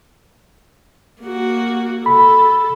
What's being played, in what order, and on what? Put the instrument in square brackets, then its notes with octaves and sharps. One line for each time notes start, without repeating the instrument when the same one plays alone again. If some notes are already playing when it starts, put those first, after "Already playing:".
[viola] A#3 F#4
[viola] A4 [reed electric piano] B5